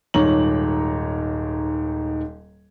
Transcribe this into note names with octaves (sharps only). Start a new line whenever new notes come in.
D#1 G#2 D#3 C#5 A#5 F#7